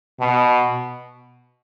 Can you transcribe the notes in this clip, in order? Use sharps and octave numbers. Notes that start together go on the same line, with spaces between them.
B2